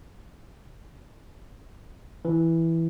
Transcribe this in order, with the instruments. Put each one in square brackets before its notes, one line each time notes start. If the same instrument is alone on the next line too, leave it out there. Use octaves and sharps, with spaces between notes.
[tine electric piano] E3